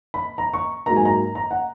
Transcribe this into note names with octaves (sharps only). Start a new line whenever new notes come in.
B5
A#5
C#6
G#2 F#3 A#3 A#5
G#5
A#5
A#5
F#5